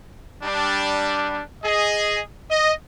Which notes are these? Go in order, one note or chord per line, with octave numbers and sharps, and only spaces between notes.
G3 D4
G#4 D#5
D#5